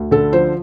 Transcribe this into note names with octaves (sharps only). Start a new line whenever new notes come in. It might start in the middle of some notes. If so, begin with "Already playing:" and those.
Already playing: D2
D3 A4
F3 C5